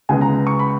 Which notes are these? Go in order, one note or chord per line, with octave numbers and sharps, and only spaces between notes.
C#2 C#3 G#3 B3 G#5
A#5
C#6
B5